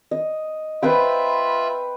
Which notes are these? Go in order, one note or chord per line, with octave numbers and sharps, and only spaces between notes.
D#5
F4 B4 C5 E5 G5 B5